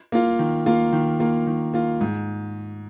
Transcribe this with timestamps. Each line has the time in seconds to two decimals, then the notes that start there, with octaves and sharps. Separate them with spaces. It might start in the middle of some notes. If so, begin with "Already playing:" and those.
0.12 A#3 F4
0.39 D#3
0.66 A#3 F4
0.93 D#3
1.20 A#3 F4
1.47 D#3
1.74 A#3 F4
2.01 G#2